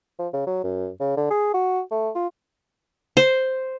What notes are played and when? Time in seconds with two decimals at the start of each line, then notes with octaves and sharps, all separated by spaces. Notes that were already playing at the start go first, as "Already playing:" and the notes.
0.19 F3
0.33 C#3
0.47 F#3
0.64 F#2
1.00 C#3
1.17 D3
1.31 G#4
1.54 F#4
1.92 A3
2.15 F4
3.17 C5